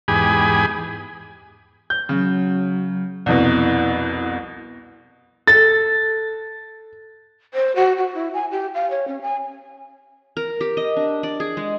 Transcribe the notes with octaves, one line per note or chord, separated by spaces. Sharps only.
E2 G#2 G4 G#4 G#5 B5
G6
C#3 F#3
C2 F2 B2 E4
A4 A6
C5
F#4
F#4
E4
G#5
G4
F5
C#5
C#4
G#5
A#4
G4
D#5
D4
D5
G#4
G#3